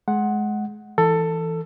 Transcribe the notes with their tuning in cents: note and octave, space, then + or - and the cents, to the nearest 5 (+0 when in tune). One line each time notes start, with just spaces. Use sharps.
G#3 +25 F#5 +0
E3 +0 A4 +15